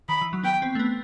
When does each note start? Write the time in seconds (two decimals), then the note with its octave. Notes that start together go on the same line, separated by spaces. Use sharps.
0.09 D#3 B5
0.21 E3
0.33 F#3
0.43 B3 G5
0.62 C4
0.75 A3
0.79 B3